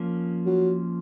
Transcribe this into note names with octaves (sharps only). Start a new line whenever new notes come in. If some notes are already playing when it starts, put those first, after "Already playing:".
Already playing: F3 A#3 C#4
F#3